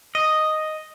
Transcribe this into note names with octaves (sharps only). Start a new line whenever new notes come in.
D#5